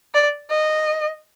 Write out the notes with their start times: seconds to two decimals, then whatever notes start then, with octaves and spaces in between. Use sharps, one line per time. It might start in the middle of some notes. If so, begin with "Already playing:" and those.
0.14 D5
0.50 D#5